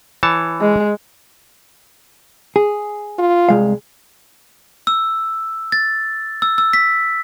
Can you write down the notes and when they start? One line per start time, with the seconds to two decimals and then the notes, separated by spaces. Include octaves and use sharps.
0.23 E3 C#5 A5
0.61 G#3
2.56 G#4
3.19 F4
3.49 C2 G#3 F5
4.87 E6
5.72 A6
6.42 E6
6.58 E6
6.73 B6